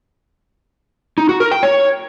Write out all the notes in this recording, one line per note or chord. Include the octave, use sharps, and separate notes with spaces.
D#4
F#4
A#4
G5
C#5